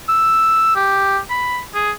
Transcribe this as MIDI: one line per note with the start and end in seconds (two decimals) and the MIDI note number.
0.09 0.71 88
0.76 1.19 67
1.30 1.60 83
1.75 1.91 68